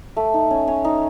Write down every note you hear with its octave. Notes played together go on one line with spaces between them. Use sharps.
A3
D#4
C#4
C#4
D#4